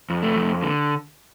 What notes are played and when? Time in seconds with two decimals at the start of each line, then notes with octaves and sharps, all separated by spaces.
0.10 F2
0.22 A3
0.36 F2
0.63 D3